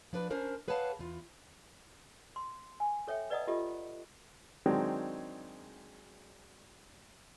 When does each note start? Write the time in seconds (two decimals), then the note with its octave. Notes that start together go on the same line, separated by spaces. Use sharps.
0.13 F3 D4 B4 D5
0.30 C#4 D4 A#4 C5
0.68 G#4 B4 C#5 F5 F#5 A5
0.99 E2 F4
2.36 C6
2.80 G#5
3.07 A4 C#5 E5 G5
3.30 B4 D5 D#5 F#5 A#5 D#6
3.47 F4 G4 A4 D#5
4.66 D#3 F#3 G#3 C4 D4